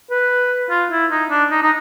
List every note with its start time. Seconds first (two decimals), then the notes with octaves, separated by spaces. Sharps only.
0.11 B4
0.70 F4
0.92 E4
1.11 D#4
1.31 D4
1.51 D#4
1.63 D#4